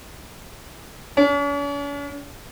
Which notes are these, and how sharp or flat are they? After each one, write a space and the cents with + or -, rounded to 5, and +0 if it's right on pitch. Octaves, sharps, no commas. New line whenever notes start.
C#4 +45